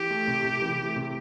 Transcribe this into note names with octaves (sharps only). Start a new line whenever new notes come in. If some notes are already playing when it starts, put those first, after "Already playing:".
Already playing: E3 G4
A3
C3
C3
E3
A3
C3